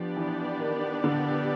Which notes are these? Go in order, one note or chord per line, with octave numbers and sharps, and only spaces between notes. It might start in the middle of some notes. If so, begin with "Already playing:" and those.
Already playing: F3 B3 D4 G4 B4 D5
E3
D#3
D3